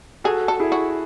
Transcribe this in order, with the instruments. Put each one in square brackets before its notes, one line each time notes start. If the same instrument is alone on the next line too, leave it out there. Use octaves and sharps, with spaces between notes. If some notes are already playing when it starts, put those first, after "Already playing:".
[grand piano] F#4 A4 [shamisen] G#4
[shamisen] A4
[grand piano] E4 G#4
[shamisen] F#4